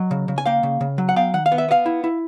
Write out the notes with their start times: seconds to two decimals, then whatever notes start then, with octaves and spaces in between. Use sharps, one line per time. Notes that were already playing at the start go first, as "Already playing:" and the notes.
Already playing: F#3 D#5
0.11 C#3
0.28 C#3
0.38 G#5
0.46 A#3 F5 G5
0.63 C#3
0.81 C#3
0.98 F#3
1.09 F#5
1.16 B3 F5 G5
1.34 D#3 F#5
1.46 F5
1.52 B3
1.58 E5
1.68 B3 D#5 F5
1.86 E4
2.04 E4